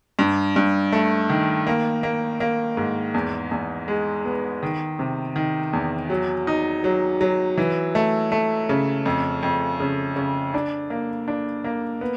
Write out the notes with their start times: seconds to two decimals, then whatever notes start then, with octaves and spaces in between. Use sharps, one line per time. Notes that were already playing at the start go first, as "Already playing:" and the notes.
0.19 G2
0.56 G2
0.92 A3
1.30 D#3
1.67 A#3
2.03 A#3
2.40 A#3
2.77 G#2
3.14 E2
3.51 E2
3.88 G#3
4.25 B3
4.63 D#3
4.99 C3
5.36 D#3
5.73 E2
6.10 F#3
6.47 D#4
6.84 F#3
7.21 F#3
7.57 E3
7.95 A3
8.32 A3
8.69 C#3
9.06 F2
9.43 F2
9.80 C#3
10.16 C#3
10.54 D4
10.90 A#3
11.28 D4
11.64 A#3
12.01 B3